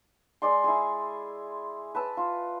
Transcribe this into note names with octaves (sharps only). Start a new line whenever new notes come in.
G#3 D5 C6
E4 G#4
B4 A5 E6
F4